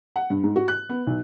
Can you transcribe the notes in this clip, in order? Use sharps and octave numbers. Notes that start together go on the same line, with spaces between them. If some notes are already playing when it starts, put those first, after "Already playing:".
F#5
G2
G#2
F#4
F#6
B3
B1